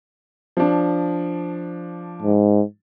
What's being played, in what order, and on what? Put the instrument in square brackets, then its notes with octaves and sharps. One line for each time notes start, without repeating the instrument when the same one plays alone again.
[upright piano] F3 D4
[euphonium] G#2